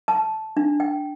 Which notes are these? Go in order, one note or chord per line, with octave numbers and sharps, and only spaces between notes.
A5
D4
G5